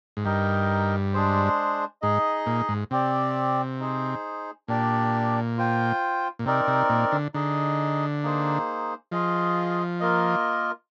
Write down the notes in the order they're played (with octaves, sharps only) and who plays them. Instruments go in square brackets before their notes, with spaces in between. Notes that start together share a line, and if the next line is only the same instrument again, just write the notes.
[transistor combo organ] G#2
[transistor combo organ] G2 [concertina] D#4 A#4 D#5 G5
[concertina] G#3 D4 G#4 C5
[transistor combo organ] G#2 [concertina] D#4 G#4 D#5
[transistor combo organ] A#2
G#2
[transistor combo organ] C3 [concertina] C4 G4 D5
[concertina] D#4 G#4 C5
[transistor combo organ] A#2 [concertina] D4 G4 D5
[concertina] F4 C5 G5
[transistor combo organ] A#2
[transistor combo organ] C3 [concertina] C4 D#4 A#4 D5
[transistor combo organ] C3
A#2
D3
[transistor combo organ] D3 [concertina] D#4 G#4 D#5
[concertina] A#3 D#4 G#4 C5
[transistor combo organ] F3 [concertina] F4 G#4 D#5
[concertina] A#3 F4 A#4 D#5